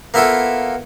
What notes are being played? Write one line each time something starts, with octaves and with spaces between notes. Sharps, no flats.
A#3 B3 E4 F4 A4